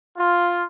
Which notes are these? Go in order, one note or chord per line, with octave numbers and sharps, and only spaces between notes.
F4